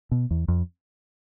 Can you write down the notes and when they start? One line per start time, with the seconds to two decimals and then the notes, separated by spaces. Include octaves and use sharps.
0.11 B2
0.31 E2
0.48 F2